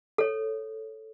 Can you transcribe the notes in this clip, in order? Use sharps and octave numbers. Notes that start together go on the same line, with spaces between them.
A4 C#5